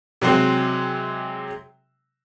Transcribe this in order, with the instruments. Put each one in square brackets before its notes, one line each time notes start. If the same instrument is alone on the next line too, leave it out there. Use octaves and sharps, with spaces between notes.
[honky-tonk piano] C3 F#3 G#3 C4